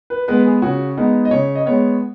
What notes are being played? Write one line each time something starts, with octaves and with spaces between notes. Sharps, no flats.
B4
G#3 B3 B4
G#4
C#3 F#4
G#3 B3 D#4
D#5
C#3 C#5
D#5
G#3 B3 C#5